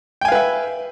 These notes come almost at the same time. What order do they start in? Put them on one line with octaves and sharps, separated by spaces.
G5 G#5 F5 B4 E5